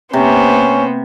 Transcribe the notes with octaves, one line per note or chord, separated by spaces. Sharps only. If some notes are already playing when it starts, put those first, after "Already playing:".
C3 A#3 B3 C#4 C5